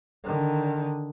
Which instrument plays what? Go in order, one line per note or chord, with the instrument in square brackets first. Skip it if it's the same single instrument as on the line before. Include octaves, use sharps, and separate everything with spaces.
[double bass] D3 D#3